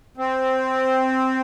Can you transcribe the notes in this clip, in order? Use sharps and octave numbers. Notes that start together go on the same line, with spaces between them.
C4